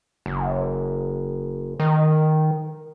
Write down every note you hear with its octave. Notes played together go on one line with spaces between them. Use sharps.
F#1
D#3